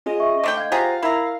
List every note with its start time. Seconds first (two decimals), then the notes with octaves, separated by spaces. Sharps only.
0.06 C#4 F4 G#4 D#5
0.19 E5 C#6
0.44 D3 A3 G5 D6
0.57 D#5 F5 G#6
0.72 F4 G4 G#4 C5 F5 F#5 A#5 A6
1.03 E4 A#4 A#5 B5 E6